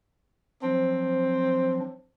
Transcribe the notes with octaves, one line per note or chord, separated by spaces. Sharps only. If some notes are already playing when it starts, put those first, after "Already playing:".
F3 F#3 C4 D4